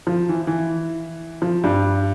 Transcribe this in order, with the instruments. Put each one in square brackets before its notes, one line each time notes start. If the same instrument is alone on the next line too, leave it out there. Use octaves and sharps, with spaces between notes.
[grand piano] F3
E3
E3
F3
G2 G3